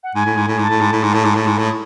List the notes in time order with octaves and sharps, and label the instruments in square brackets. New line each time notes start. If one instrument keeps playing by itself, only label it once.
[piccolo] F#5
[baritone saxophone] G#2 [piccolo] G#5
[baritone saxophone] A2
G#2
A2
[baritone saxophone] G#2 [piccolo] A5
[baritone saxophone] A2
G#2
A2
G#2
[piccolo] A5
[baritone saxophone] A2
G#2
A2
[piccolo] A5
[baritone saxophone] G#2
A2
[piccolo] D#6